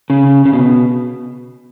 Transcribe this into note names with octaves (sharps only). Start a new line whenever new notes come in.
C#3
C#3
B2